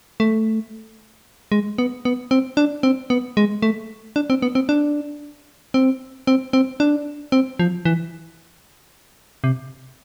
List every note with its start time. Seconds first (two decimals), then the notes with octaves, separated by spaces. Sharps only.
0.20 A3
1.52 G#3
1.78 B3
2.05 B3
2.31 C4
2.57 D4
2.83 C4
3.10 B3
3.37 G#3
3.62 A3
4.16 D4
4.30 C4
4.42 B3
4.55 C4
4.69 D4
5.74 C4
6.27 C4
6.53 C4
6.80 D4
7.32 C4
7.59 F3
7.85 E3
9.44 C3